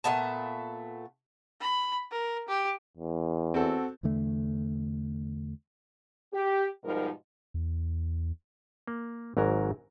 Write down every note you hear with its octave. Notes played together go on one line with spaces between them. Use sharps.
A#2 A3 B3 A5
B5
A#4
G4
E2
C4 F#4 A4
E2 D3 A3
G4
G#2 B2 F3 G3 D#4 A#4
E2
A#3
G#1 G#2 F#3 A#4